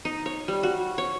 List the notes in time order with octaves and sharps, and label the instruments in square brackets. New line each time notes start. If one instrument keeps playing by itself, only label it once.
[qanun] D#4
C#5
G3
F#4
C#5